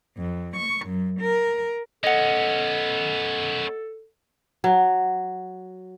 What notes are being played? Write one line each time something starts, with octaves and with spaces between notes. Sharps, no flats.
F2
C#6
F#2
A#4
B3 C#4 A4 D#5 F#5
F#3